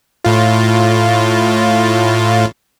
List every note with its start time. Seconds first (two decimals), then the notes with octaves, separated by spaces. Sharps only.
0.24 A2 F4